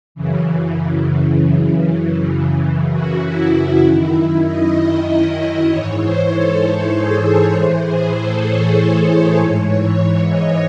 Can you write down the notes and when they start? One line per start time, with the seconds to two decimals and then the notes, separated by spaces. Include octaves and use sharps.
0.15 F#2 C#3 E3
2.00 F#2 C#3 E3
2.92 F#4
3.22 E4
3.53 E4
3.84 F#2 D#3 E4
4.46 D#5
5.69 G#2 E3 C#5
6.00 C5
6.31 A4
6.61 A4
6.92 G#4
7.22 A4
7.53 A2 E3 C5
7.84 G#4
8.15 A4
8.46 C#5
9.38 G#2 E3
10.31 D#5